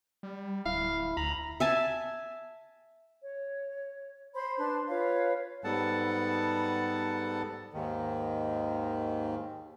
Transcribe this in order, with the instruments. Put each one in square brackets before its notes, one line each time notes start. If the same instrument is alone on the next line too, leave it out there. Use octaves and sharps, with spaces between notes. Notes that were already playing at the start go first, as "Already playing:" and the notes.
[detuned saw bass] G3
[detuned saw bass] D1 [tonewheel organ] E4 [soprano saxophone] F5
[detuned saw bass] D2 [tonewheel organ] A#5 [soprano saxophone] B5
[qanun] E5 G#5 A5
[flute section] C#5
C5 B5 C6
D4 B4 A5 C6
F4 B4 C#5 F5
[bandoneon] G#2 G3 B3 A4 F#5 A5
D#2 G#2 D#3